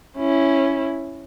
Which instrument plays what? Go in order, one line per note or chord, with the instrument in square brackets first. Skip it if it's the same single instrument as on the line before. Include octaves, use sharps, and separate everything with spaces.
[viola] C#4 E4